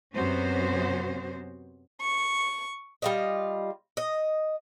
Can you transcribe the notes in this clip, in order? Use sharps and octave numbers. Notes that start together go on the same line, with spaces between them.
F#2 C3 B3 C#4 F#4 C5
C#6
G3 F4 D#5
D#5